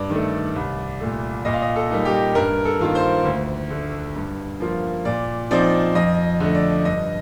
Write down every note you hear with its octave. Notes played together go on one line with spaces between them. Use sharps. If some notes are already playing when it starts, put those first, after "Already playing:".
Already playing: G2 D5
D#3 A3
C2
A#2 A3
A#2 D#5
F5
D#5
A4
G3 A#3 D#4
G4
G2 A#4
A4
D#3 A#3 F4
C5
D2
D3 A3
G2
F3 A#3 F4
A#2 D5
F3 C4 D#4 D5
F2 D#5
D3 A3
D5
G2 D#5